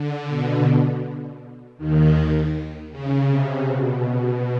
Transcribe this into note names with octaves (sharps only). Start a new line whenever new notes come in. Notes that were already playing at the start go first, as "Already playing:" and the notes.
Already playing: D3
B2
D#2 D#3
C#3
C3
B2
B2